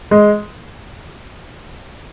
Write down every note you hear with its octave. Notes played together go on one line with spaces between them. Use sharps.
G#3